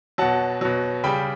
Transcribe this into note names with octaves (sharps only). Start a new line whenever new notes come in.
B2 F#3 F#5 A5
B2 F#3
C#3 G3 G5 B5